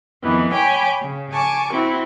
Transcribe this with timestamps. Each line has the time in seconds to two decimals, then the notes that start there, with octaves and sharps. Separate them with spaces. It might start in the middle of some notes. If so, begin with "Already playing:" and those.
0.23 F2 D#3 E3 B3
0.52 C#5 G5 G#5 B5 D6
1.02 C#3
1.32 G#5 A5 C#6 D6
1.71 C4 E4 F#4